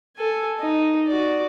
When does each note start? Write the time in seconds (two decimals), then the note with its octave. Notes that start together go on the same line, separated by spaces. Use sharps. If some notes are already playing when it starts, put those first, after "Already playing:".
0.17 A4 G#5
0.60 D#4
1.07 F#4 D5